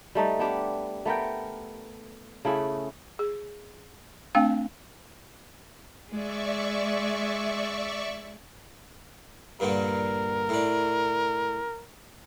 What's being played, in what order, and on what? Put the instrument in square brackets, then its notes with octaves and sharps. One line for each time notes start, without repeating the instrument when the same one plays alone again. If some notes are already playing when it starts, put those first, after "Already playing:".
[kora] G3 A3 D#4
B3 D4 G4
A3 B3 A#4 G5
C#3 A3 E4 G#4
[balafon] G#4
A3 C4 D4 F5 G5
[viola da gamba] G#3 [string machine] D5 E5 C#6
[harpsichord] G2 A#2 D3 [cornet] A#4
[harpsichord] A2 D4